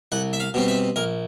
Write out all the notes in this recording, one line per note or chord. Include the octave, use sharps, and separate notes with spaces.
C2 F#5
E5
F5
B2 G3 C4
E5
A#1 A#4